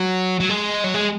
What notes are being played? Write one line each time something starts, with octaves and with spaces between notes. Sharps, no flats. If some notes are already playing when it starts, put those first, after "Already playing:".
Already playing: F#3
F#3
G#3
F#3
G#3